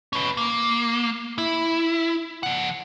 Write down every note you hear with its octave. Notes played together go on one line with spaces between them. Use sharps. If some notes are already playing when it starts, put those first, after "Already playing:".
C#4 B4
A#3
E4
F3 F#5